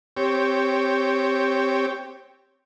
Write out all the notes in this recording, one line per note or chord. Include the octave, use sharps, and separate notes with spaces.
C4 G4 C#5